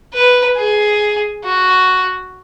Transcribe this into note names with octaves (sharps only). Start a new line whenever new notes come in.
B4
G#4
F#4